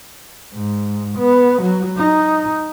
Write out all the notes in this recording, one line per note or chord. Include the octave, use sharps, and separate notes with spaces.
G#2
B3
F#3
D#4